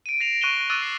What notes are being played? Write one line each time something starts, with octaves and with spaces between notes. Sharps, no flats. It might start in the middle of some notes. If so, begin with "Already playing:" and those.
D7 D#7
A#6 C7 E7 F7
C#6 F#6 A#6 D#7 E7 G7
C#6 D6 E6 F#6 A6 D#7
C7